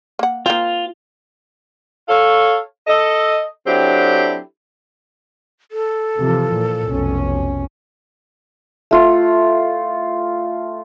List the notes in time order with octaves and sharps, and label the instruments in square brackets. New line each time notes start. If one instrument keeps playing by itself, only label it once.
[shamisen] A#3 F#5
[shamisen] A#3 C4 [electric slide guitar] F4
[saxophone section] A4 C#5 F5
A4 D#5
F#3 C4 D4 E4 G4 A4
[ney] A4
[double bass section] C3 E3 F3
A#2
F1 B1 C#4
[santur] A3 F4